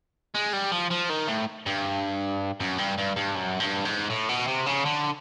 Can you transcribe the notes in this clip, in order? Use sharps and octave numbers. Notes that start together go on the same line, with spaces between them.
G#3
G3
F3
F3
D#3
A2
G2
F#2
G2
G2
G2
F#2
G2
G#2
A2
B2
C3
C#3
D3